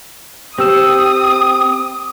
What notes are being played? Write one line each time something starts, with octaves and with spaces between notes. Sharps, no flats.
C4 G4 D#6 E6 E7